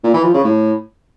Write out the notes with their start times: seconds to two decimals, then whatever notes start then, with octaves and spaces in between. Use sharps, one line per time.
0.04 A#2
0.14 E3
0.24 F3
0.34 C#3
0.44 A2